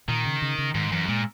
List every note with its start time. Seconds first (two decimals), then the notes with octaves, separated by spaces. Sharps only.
0.08 A#2 D#3
0.25 C#3
0.42 C#3
0.58 C#3
0.75 G#2 D#3
0.92 F#2 E3
1.08 A#2 G#3